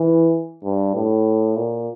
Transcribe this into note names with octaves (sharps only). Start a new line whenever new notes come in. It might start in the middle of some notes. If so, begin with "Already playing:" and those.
Already playing: E3
G2
A2
A#2